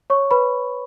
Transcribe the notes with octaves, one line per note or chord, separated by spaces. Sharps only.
C#5 C#6
B4 B5